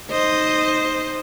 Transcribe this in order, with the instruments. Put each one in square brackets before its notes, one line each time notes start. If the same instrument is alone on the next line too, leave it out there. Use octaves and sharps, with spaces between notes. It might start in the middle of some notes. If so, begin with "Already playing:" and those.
[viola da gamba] D#4 C5 D#5